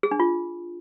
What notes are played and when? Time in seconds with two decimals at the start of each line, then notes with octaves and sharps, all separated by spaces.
0.03 G#4
0.11 D4
0.20 F4